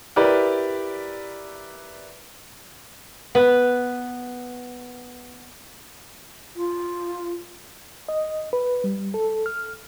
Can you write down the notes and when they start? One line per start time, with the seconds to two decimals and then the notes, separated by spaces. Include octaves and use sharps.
0.16 E4 G4 A#4 B4 D5
3.35 B3 B4
6.56 F4
8.09 D#5
8.53 B4
8.84 G3
9.14 A4
9.46 F6